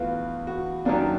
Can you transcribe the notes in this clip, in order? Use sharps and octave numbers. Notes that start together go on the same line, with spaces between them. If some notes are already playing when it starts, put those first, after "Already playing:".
Already playing: E2 A3 F4 F#4 B4
F#4
F#2 D#3 F#3 A#3 D4